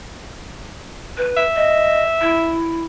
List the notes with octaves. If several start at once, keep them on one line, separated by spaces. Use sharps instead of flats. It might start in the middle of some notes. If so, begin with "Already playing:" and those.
B4
E5
D#5
E4